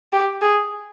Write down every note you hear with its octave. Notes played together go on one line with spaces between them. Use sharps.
G4
G#4